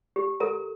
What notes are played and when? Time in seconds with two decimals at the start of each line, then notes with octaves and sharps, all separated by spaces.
0.16 G4
0.40 A4 A#4 A#5